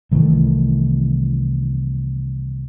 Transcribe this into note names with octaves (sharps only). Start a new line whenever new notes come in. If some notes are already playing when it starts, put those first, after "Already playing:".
C2 D#3 E3 A3